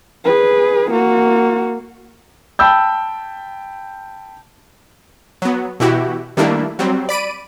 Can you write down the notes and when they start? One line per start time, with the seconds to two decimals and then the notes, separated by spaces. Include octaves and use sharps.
0.25 G#4 B4
0.91 A#3 F#4
2.59 G5 A5 B5 E6 G6
5.42 F#3 B3
5.80 B2 E3 E4 F#4 G4
6.37 D#3 G3 A3 A#3 D4 E4
6.79 F#3 G3 C4
7.09 D5 B5 D7 D#7